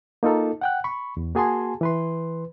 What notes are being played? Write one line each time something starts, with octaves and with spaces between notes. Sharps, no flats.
A#3 D#4 F4 A4
F#5 G5 F#6
B5 C#6
E2
A#3 F#4 G#4 G#5 A5 C6
E3 B4 C6